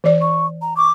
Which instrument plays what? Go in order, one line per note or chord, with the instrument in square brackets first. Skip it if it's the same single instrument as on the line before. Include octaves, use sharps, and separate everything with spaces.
[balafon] E3 D5
[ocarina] C#6
A#5
[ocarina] C#6 [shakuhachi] D6